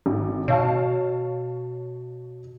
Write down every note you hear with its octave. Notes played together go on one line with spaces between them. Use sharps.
G#1
B2 C#5 F5 A5